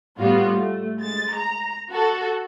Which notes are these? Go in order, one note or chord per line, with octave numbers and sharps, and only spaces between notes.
A2 G3 B3 F4 F#4
A3
G#3 A6
A#5
F#4 A4